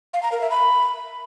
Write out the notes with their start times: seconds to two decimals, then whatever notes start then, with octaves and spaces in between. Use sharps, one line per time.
0.14 F5
0.23 A#5
0.32 A#4
0.41 E5
0.50 B5